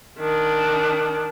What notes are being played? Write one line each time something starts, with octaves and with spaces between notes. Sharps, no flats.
D#3 D4